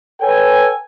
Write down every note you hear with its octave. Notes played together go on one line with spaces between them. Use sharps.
A4 B4 C#5 G5 G#5